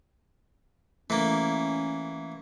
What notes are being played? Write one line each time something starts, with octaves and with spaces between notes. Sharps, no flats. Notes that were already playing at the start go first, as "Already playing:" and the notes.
E3 A3 A#3 C#4